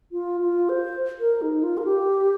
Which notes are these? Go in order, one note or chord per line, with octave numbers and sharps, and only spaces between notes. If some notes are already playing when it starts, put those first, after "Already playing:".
F4
F4
C5
A#4
D#4
F4
A#4
G4